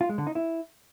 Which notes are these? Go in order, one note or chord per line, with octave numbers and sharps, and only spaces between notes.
F4
G#3
D3
D#4
E4